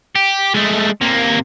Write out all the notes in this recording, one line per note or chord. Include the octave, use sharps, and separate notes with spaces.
G4
G#3 A3
C3 A#3